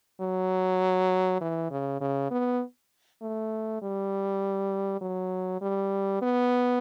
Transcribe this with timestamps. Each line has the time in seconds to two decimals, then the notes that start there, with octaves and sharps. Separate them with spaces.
0.21 F#3
1.41 E3
1.71 C#3
2.01 C#3
2.31 B3
3.22 A3
3.82 G3
5.01 F#3
5.62 G3
6.22 B3